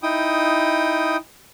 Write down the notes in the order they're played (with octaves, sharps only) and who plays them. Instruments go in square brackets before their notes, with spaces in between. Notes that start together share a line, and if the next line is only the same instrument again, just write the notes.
[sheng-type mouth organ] D#4 E4 G5 D#6